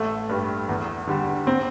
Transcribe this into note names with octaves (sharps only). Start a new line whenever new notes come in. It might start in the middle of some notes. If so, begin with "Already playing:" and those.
Already playing: A1 A3
G2 G3
E2
D3 G3
C4